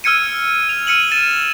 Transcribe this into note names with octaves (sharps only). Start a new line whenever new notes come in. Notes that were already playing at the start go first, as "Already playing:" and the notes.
E6 F6 G#6 C#7 D#7
F7
F6 C#7 D#7 F#7
A6 D#7 E7